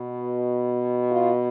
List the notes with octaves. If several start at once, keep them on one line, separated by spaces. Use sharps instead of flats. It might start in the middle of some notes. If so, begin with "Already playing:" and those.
Already playing: B2
F4